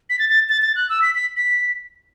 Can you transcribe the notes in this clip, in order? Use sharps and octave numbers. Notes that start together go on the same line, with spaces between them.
B6
A6
A6
A6
A6
F#6
E6
B6
B6
B6